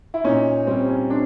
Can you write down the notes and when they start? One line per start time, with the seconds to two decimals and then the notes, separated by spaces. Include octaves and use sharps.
0.14 E4
0.24 A#2 C#4 D#4
0.67 G3 C4
0.89 C#4
1.10 C4 D4